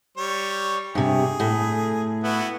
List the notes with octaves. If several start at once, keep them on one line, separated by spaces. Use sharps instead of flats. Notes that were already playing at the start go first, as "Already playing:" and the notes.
G3 C#5
G2 C3 G#4
A2
B3 E4 F#4